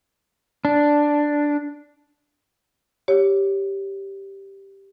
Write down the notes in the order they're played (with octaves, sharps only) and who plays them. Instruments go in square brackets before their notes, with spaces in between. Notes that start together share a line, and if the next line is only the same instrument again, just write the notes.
[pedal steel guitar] D4
[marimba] G4 C#5